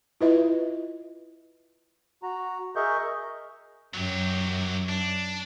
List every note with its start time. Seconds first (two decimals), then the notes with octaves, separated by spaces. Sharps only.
0.21 E4 F4 B4 D#5 E5
2.23 F#4 A#5
2.76 G#4 A#4 D#5 E5 C#6 G6
3.94 F#2 F#3 G4
4.89 D4